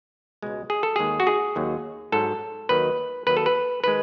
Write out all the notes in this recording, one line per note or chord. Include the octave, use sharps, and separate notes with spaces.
C#2 B2 G#3
G#4
A4
D#2 D#3 G#3 G#4
F#4
G#4
D#2 D#3 F#3
G#2 F#3 A4
D#2 D#3 F#3 B4
D#2 D#3 F#3 B4
A4
B4
D#3 G#3 B4